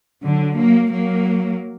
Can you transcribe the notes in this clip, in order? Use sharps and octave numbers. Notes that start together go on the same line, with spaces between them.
D3 F#3
F#3 A#3
F#3 A#3